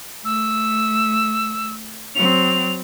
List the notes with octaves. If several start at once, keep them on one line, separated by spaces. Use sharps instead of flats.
A3 E6
F#3 C4 F7